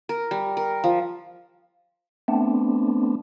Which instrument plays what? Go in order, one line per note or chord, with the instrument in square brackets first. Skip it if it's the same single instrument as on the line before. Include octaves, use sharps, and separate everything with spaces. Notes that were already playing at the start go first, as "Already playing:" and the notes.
[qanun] A#4
G3
A#4
F3
[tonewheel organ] A3 B3 C4 D4